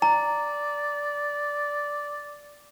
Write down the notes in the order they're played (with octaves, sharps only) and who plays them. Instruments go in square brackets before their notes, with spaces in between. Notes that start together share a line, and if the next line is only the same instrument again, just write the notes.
[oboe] D5 [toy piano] A#5